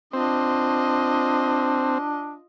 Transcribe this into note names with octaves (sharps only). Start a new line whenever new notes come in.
C4 D4 F4 D#5